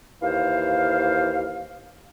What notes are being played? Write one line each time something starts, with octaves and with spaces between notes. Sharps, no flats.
D#2 E3 C5 F5